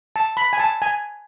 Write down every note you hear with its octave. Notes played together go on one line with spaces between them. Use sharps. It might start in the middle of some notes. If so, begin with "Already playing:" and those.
A5
B5
G#5
A5
G#5